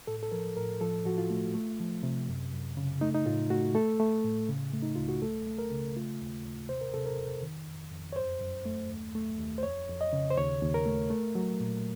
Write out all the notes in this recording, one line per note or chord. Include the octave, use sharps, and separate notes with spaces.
A2 A4
A4
F3 A#4
A2 A#4
F3 A4
F3 F#4
F4
A3
A3
F3
C3
F#2
F#2
C#3
A3 D#4
D#4
A2 F4
A3 F#4
A3 A4
A3
A2
C#3
A3
D#4
C#2 F4
F#4
A3 A4
A3
A#4
C#3
A3 F4
D#2
D#2
C3 C5
A#4
C3 A4
A#4
F2
D#3
F2
F2
C#5
F#2 C5
F#2
A3
D#2
A3
D#2
C5
F2 C#5
F2
D#5
C#3
C5
D#2 C#5
D#2
A#4
A3
A3
F#3
A#2